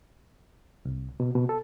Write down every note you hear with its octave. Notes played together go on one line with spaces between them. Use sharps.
C2
B2
B2
A4